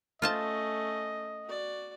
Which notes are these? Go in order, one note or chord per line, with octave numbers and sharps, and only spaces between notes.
A3 C#4 F4 C5 D#5 A5
F#4 D5